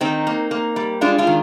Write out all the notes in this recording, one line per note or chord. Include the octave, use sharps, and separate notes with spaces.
D#3 C4 D#4
A#3
A#3
G3
G#3 D4 F4
D4 F4
D#3